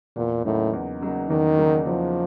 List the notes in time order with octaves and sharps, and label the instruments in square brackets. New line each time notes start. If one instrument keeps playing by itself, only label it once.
[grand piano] E2 [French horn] A#2
[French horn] A2 [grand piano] C#3 F#3 A#3 D#4
[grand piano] E2
C#3 F#3 A#3 D#4
[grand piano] E2 [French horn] D#3
[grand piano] C#3 F#3 A#3 D#4
[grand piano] E2 [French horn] F3